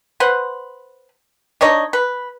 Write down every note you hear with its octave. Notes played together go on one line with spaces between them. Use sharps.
B4 C5 F#5
D4 D#4 C#5 D#5
B4